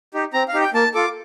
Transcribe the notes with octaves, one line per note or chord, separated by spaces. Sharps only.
D#4 G4
C4 A#5
F5
D#4 G4
G5
A#3 A5
F4 A4 D6